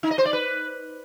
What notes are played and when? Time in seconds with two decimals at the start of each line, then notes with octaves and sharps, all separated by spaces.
0.03 D#4
0.11 D#5
0.18 C5
0.25 D5
0.33 B4